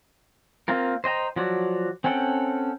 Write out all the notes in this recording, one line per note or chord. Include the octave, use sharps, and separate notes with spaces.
A#3 C4 F4 A#4
C5 D#5 G5 A#5
F3 F#3 F#4 D5
C4 C#4 A4 F#5 G5